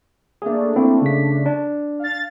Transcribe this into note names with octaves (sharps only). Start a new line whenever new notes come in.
A3 A#3 D4 G#4
A#3 C4 E4
C#3 B6
D4
F5 A6